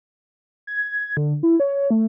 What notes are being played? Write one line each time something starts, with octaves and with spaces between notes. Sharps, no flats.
G#6
D3
E4
C#5
A3